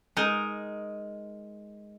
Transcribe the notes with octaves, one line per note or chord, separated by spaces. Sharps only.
G#3 D#4 A#4